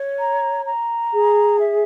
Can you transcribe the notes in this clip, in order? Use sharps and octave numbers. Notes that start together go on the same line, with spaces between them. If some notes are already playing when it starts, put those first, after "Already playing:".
Already playing: C#5
A#5
A#5
G#4
E5